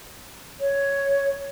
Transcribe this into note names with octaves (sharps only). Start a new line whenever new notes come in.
C#5